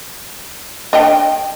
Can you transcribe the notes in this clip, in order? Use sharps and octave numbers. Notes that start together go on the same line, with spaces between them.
D4 D#5 G5